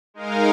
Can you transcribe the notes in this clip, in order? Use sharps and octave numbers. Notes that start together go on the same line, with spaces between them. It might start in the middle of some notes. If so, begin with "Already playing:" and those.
G#3 D#4 A#4 F5